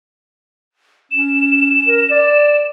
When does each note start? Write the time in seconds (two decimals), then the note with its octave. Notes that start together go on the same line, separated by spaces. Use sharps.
1.11 C#4 E7
1.87 A#4
2.10 D5